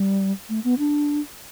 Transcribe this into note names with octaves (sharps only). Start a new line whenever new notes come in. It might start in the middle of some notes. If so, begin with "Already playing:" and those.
Already playing: G3
A3
B3
D4